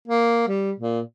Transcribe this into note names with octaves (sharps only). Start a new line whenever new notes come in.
A#3
G3
A#2